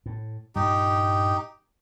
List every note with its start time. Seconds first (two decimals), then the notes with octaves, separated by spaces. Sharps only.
0.06 A2
0.56 G2 A#2 G3 D#4 G4